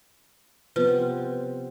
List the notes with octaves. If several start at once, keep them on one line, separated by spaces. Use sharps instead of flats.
C3 F3 B3 C4 B4